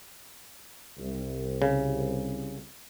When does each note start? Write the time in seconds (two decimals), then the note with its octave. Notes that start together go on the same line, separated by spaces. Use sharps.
0.98 C2
1.62 C#3